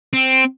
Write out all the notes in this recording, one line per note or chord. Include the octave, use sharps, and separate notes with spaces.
C4